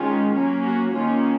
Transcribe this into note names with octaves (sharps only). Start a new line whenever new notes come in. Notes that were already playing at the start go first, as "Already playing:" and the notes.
Already playing: D#3 G#3 C#4 F4
F#3 A#3 C#4
F#4
D#3 A#3 C#4 F4